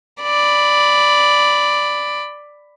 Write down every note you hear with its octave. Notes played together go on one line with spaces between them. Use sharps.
D5 B5